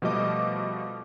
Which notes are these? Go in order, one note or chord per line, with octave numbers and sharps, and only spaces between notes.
B2 F3 G3 A3 D#5 D6